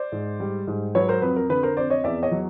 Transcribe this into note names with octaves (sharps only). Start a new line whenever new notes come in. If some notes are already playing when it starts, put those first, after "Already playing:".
Already playing: C5 D5
G#2
G3
G#2
F#3 B4 C#5
A#4 C5
F2 B4
A#4
D3 B4
A#4 C5
F2 C5 D5
C#5 D#5
E2 D5 E5
C#5 D#5
F#3